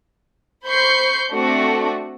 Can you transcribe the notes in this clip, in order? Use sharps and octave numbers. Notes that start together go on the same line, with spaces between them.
C5 B5 C#6 G6 C7
A3 C4 D4 F#4